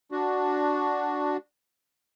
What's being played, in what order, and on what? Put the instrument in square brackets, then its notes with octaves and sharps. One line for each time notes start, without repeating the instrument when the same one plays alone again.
[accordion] D4 F#4